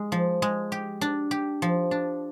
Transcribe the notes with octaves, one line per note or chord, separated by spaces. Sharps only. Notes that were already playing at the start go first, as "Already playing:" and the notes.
Already playing: G#3
F3
G#3
G4
D4
G4
F3
D4